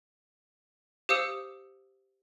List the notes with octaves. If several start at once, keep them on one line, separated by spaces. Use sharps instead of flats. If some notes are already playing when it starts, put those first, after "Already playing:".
G4 C5 F5 D#6 E6 C#7